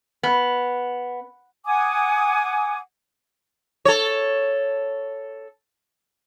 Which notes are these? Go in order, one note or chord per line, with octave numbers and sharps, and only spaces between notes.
B3
F#5 G#5 D6 D#6
A4 C#5